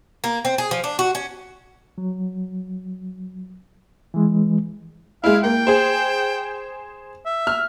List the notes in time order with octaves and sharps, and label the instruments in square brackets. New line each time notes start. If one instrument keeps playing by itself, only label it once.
[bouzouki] A#3
C4
G#4
F3
D4
F#4
C#4
[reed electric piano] F#3
E3 G#3
[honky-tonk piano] G#3 E4 [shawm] F5
[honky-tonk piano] A#3 [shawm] G5
[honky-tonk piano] G#4 C5
[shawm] E5
[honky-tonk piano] F6